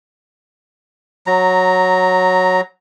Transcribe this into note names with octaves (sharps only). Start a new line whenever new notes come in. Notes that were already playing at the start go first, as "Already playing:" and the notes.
F#3 A#5